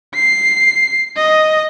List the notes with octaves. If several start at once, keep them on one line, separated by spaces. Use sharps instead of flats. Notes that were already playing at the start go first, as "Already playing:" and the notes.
C7
D#5